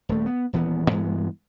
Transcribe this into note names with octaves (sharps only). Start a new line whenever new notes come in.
D#1 A3
B3
D#1 E3 B3
G2 E3 G#3 B3